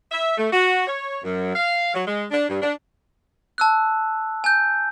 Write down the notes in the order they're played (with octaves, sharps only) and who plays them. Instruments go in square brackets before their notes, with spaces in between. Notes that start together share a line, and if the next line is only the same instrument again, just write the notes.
[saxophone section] E5
A3
F#4
C#5
F#2
F5
F#3
G#3
D4
G2
D4
[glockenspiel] A5 E6 F#6
G#5 G6